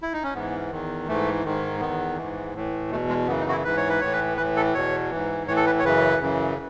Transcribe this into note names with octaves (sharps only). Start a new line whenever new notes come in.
E4
D#4
C#4
G#2 E3 B3
E2 D#3
G#2 E3 A3
G#2 D#3
E2 D#3 B3
G#2 E3
A2 E3
E2 B2 A3
G#3
F#2 C#3 E3 B3
D#4
F#4
E4
G#2 E3 B4
C#5
B4
A2 E3 C#5
B4
A2 E3 B4
A4
E2 B2 C#5
E3
G#2
A2 E3 C#5
A4
B4
C#5
F#2 C#3 E3 B4
F#2 C#3 E3